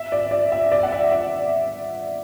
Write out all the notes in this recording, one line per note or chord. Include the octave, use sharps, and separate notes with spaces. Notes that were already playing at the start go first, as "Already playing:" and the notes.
Already playing: E5
D5
D5
E5
D5
F#5
E5
D5